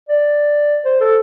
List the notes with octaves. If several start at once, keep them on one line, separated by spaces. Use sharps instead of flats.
D5
C5
A4